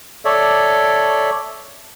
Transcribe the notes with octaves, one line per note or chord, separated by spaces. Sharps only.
A4 C#5 D5 E5